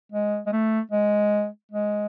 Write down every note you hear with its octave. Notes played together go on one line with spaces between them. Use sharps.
G#3
G#3
A3
G#3
G#3